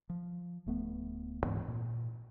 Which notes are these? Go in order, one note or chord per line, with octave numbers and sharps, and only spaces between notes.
F3
D1 A3 B3
D2 G#2 E3 C4
A#2